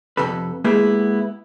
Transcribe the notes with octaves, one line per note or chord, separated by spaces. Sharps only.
F2 C3 A4 B4
G#3 A#3 B3 E4 G4 G#4